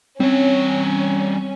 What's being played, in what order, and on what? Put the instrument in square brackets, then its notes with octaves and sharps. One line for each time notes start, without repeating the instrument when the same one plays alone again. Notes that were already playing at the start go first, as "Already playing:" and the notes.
[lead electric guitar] G3 C#5 [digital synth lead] C4 [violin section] C#4